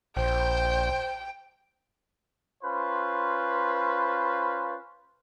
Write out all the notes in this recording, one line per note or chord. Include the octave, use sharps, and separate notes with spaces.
A#1 C5 G5
C#4 F4 B4 C5